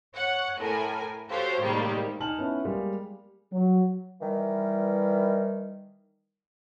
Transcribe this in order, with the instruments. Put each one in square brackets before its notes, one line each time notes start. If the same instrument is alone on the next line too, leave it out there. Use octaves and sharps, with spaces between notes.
[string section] C#5 F#5
A2 A#4 G#5
F#4 G4 A4 C5 C#5 F5
A2 C3 D#3 G3 G#3 A#3
[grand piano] D#4 G#5 A5 F6 F#7
B3 C#4 E4
G3 G#3 A#3
[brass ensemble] F#3
[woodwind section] D#3 E3 G3